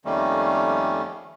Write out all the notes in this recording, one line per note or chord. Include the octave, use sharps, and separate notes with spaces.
F2 D#3 G3 A3 A#3 C#4